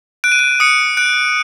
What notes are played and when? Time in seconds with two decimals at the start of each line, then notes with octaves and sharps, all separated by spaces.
0.24 F#6 D7
0.32 D#7
0.39 D7
0.60 D#6 C#7
0.97 F#6 D7